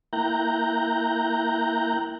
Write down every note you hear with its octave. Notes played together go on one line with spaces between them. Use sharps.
A#3 E4 G5 A#5 F#6 G6